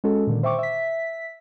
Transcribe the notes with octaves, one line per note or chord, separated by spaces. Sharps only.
G#3 C#4 F#4 A4
A#2 D3 D#3
C5 E5 G5 C#6 D6
E5 B6